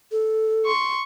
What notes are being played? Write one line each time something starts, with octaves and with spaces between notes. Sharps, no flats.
A4
C6 C#6